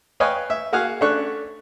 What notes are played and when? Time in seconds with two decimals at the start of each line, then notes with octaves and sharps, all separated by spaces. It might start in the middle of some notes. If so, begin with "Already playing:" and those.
0.20 B4 C#5 D#5 F5 G5 G#5
0.50 E5
0.72 A#3 F#4 G#4 F5 G#5
1.01 A3 C#4 D4 C#5 C#6 F#6